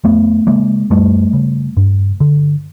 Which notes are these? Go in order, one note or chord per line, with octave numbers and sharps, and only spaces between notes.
F2 A3 B3
C#3 G#3 A#3
F#2 G3 A3
C#3
G2
D3